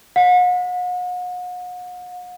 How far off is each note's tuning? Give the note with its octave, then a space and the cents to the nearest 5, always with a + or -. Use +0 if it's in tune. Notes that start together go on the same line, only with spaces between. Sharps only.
F#5 -45